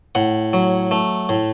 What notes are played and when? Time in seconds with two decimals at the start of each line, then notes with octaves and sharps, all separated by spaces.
0.15 A2 F#5
0.53 F#3
0.91 A3
1.29 A2